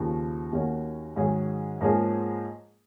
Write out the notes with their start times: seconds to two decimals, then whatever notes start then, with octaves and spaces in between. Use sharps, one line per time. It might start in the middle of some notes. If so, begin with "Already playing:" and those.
Already playing: D#2 C#3 F3
0.52 D#2 D#3 A#3 C#4 F#4
1.16 G#2 D#3 F#3 C#4 G#4
1.81 G#2 F3 A#3 C#4 G#4